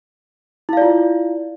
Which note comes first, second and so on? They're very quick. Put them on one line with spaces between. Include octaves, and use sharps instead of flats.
E4 F5 D5 F4